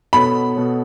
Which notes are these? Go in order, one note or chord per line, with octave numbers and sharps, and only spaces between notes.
B2 B3 A4 C#5 B5
B2 B3 A4 C#5